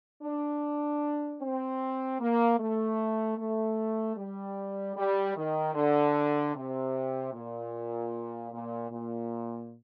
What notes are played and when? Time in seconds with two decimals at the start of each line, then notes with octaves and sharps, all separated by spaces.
0.23 D4
1.41 C4
2.21 A#3
2.59 A3
3.38 A3
4.17 G3
4.97 G3
5.36 D#3
5.75 D3
6.55 C3
7.33 A#2
8.52 A#2
8.91 A#2